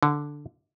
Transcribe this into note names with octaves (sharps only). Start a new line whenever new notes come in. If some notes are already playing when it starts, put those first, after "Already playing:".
D3